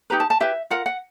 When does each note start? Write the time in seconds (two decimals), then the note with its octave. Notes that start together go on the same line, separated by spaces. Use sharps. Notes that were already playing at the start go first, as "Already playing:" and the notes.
0.10 D#4 G4 B4 A#5
0.20 A5
0.30 A5
0.40 E4 G4 B4 E5
0.70 F4 A#4 F#5
0.86 F#5